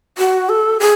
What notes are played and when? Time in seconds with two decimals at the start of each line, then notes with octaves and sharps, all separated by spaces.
0.18 F#4
0.49 A4
0.80 G#4